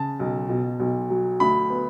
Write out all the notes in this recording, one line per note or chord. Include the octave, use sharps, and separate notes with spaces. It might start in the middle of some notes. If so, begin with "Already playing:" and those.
Already playing: C#3 A5
B1
B2
B1
F#3
D2 B5
B3